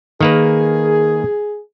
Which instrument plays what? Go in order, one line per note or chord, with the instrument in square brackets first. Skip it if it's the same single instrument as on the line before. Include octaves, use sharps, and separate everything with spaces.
[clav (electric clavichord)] D#3 A#3 B4 [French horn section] G#4